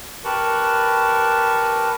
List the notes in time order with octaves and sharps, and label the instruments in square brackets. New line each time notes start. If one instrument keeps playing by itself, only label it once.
[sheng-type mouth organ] G4 A#4 B4 A5 C#6 F#6